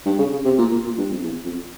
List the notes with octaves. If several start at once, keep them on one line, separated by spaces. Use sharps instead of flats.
G2
C#3
C#3
C3
A#2
A#2
A#2
G2
F2
E2
F2